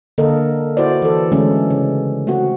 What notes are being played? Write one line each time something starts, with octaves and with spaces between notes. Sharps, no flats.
D3 A#3 A4 A#4 D#5
E4 F#4 C5 D5
E3 A4
D3 E3 G#3 A3 C#4
C#3
A3 C4 F#4